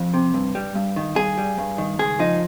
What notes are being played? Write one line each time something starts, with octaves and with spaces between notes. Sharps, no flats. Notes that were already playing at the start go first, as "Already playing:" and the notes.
Already playing: F2
C3
G2
G3
G2
D#3
G2 G#4
G3
G2
D#3
C#2 G#4
F3 D#4